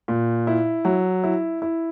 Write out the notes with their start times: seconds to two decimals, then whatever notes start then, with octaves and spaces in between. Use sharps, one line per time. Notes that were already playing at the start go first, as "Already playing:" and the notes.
0.08 A#2
0.47 E4
0.85 F#3
1.24 E4
1.62 E4